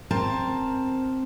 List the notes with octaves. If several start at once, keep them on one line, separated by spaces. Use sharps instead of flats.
C4 A#4 A5